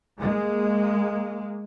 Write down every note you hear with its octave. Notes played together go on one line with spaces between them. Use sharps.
G#3 A#3